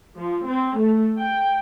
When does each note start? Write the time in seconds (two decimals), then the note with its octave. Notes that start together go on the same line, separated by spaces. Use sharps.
0.18 F3
0.46 C4
0.79 A3
1.16 G5